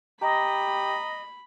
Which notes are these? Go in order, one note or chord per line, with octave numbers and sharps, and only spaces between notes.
G4 D#5 A#5 B5